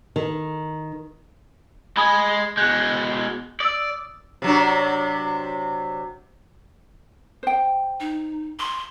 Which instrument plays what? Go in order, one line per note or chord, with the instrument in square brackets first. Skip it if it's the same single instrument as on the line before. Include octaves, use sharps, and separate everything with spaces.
[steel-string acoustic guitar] D#3
[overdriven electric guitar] G#3 G#4 [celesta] B5 D#6
[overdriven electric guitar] B2 G#3 [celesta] F#6 G6
[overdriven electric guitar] D5 [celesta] D#6 E6
[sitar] C3 F#3 D4
[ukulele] C5 G5
[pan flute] D#4
C6